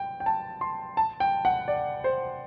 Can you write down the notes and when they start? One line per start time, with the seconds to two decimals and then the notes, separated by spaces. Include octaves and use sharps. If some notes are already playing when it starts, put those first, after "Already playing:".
Already playing: G5
0.20 G5
0.26 A5
0.61 C6
0.97 A5
1.20 G5
1.45 F#5
1.68 D5
2.04 C5